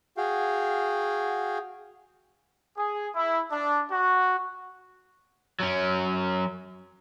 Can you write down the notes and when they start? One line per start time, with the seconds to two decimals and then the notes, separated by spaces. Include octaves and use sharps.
0.17 F#4 G#4 F5 G5
2.76 G#4
3.15 E4
3.51 D4
3.90 F#4
5.60 F#3 C#4